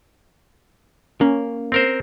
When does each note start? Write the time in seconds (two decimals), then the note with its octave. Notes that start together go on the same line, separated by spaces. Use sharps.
1.21 A#3 C#4
1.72 C4 A#4 C5